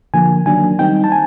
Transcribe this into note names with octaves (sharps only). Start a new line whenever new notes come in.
D3 F3 A#3 G#5
D#3 F#3 A#3 D4 G#5
D#3 G3 C4 D#4 G5
A5
G#5